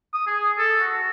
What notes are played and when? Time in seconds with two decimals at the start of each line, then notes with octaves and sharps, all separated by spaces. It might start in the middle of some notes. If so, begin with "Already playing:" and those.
0.14 D#6
0.27 G#4
0.58 A4
0.80 F#4